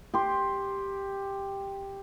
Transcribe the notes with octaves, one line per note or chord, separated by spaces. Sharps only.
G4 C6